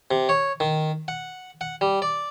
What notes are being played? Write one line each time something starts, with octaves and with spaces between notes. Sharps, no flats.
C3
C#5
D#3
F#5
F#5
G3
D5